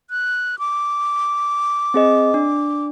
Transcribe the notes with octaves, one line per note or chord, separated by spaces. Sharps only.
F#6
D6
C4 G#4 D#5
D4